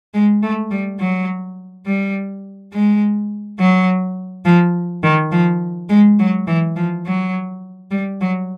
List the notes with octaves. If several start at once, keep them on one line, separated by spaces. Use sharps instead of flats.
G#3
A3
G3
F#3
G3
G#3
F#3
F3
D#3
F3
G#3
F#3
E3
F3
F#3
G3
F#3